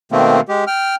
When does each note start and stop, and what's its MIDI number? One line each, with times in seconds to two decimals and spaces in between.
0.12 0.41 47
0.12 0.41 51
0.12 0.41 57
0.12 0.41 58
0.12 0.41 60
0.48 0.65 56
0.48 0.65 67
0.67 0.95 79
0.67 0.95 89